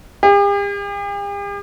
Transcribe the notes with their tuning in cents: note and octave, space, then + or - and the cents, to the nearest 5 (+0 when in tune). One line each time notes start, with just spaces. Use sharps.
G4 +45